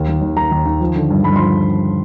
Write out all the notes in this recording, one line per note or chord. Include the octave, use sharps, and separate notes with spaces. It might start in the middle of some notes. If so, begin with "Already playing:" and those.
Already playing: D#2
D#3
D#2
D#3 A#5
D#2
D#3
F3
D3
G2
G2 B5
C6
F3